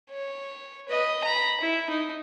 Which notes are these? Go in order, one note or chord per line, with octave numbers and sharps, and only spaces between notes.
C#5
B4 D#5
A#5 B5
E4
D#4